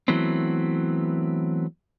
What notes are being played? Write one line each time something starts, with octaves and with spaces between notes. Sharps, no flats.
E3 F#3 A3 B3 C4